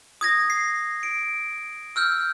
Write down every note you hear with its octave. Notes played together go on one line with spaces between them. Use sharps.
D#6 G#6 A#6
C7
D7
E6 F6 G6